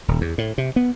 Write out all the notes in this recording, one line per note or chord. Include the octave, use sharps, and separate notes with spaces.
D#1
E2
A2
C3
B3